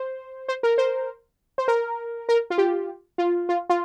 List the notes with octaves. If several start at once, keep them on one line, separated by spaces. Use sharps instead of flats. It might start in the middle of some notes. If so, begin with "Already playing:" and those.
Already playing: C5
C5
A#4
C5
C5
A#4
A#4
F4
G4
F4
F4
F4